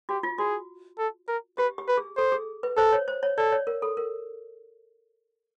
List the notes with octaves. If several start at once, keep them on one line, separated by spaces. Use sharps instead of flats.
F#4 G4
F4
F#4 G#4
A4
A#4
G4 B4
G4
B4
G#4
A4 C5
G#4
B4
A4 C5
C#5
C5
C#5
A4 D5
C#5
A#4
A4
A#4